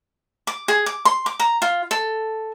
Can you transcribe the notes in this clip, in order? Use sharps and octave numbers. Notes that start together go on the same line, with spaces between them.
D6
G#4
D6
C6
D6
A#5
F4
A4